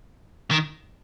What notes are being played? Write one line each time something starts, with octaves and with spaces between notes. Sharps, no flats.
D#3